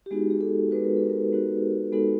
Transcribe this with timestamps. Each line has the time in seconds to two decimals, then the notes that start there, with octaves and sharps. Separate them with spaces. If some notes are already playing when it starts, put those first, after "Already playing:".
0.06 G4
0.11 G#3 B3 D#4 F#4 G#4
0.30 G#4
0.41 A4
0.71 G#3 B3 D#4 F#4 B4
0.84 A#4
0.97 A4
1.10 A#4
1.32 G#3 B3 D#4 F#4
1.92 G#3 B3 D#4 F#4 A4